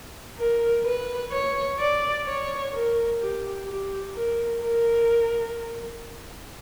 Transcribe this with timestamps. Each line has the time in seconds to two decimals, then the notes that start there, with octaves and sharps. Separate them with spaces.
0.38 A#4
0.85 B4
1.32 C#5
1.79 D5
2.26 C#5
2.73 A#4
3.20 G4
3.67 G4
4.15 A#4
4.62 A#4